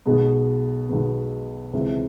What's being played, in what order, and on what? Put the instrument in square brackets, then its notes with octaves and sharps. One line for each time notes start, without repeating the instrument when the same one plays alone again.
[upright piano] B1 B2 G#3 B3
B1 B2 G#3 B3
C#2 C3 E3